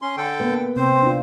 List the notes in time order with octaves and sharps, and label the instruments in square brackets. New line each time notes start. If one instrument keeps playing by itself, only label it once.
[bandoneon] C#4 C6
D3 A4 G5
[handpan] A#3 B3 B4
[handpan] C3 [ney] C4 [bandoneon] C5
[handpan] D4 F4